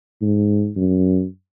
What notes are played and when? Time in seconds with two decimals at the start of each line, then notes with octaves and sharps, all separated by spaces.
0.22 G#2
0.77 F#2